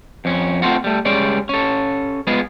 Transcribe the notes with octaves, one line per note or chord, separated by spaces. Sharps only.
F2 C#4
A3 C4 F4 F#4
G3 A3
G3 G#3 C#4 D5
C#4 A4
G#3 B3 F4 G#4